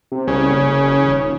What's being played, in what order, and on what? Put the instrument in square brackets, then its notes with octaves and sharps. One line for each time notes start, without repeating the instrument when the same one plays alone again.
[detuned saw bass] C3
[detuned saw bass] C2 [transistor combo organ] C#3
[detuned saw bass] F#1
D#1